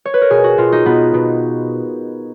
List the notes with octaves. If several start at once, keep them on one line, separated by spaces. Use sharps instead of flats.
C#5
B4
A#4
B2 G#4
F#4
B2 F4
D#4
B2 B3
B2